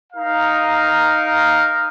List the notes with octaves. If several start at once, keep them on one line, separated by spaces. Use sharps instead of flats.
D#4 A#4 F5